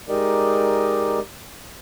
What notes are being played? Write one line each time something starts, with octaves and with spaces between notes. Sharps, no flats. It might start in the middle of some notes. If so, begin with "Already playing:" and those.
G#3 D#4 G4 A#4 D5 D#5